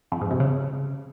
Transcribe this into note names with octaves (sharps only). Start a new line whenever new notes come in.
F2
G#2
C3
C#3